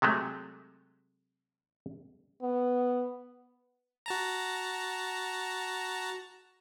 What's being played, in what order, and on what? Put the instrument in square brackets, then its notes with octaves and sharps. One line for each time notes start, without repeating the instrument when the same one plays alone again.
[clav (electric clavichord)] C3 F#3 G#3 A3
[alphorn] B3
[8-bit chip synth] F#4 A5 A#5